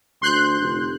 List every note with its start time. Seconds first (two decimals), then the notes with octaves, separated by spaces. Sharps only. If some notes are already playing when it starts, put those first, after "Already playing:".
0.22 D2 C6 F#6 G6
0.60 F1